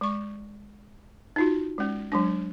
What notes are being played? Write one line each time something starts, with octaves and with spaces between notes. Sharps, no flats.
G#3 C#6
D#4 F4 F#4
G#3 C#4
F#3 G#3 D4